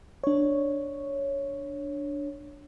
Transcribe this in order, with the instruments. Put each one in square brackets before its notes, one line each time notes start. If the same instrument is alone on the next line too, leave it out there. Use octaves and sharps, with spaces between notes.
[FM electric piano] D4 C#5